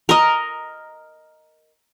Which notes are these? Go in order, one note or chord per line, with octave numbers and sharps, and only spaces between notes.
A#4 D#5